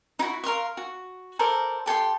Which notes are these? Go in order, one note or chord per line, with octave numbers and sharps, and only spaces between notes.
D#4 E4 F#4
A#4 F5 C6 C#6
F#4
A4 A#4 C5 D5
G4 A4 G5 C6